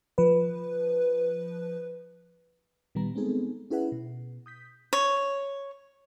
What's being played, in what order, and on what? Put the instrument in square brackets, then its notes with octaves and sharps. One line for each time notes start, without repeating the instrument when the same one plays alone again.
[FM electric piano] F3 B4
A#2 D#3 G3 B3 A#5
G#3 B3 C4 D#4 G#4 A4
C#4 E4 G#4 B4 E5 F#5
B2
D#6 G6 B6
[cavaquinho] C#5